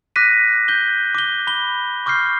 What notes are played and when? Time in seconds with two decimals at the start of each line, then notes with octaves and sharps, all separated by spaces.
0.16 D6 F#6 A#6 B6 D#7
0.68 G6 G7
1.15 D6 G7
1.47 B5 G7
2.06 C#6 D6 F6 G6 C7